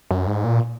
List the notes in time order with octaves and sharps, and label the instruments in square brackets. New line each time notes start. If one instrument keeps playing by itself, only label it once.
[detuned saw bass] F#2
G#2
A#2